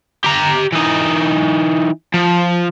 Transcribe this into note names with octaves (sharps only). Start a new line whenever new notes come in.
G4 A#5
E3 D#4
F3